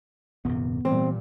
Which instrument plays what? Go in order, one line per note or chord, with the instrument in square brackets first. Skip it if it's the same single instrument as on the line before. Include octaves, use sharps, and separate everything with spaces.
[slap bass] D#1 F#2 C3 [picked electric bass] B3
[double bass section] A#2 G3 [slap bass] E3 [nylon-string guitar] C4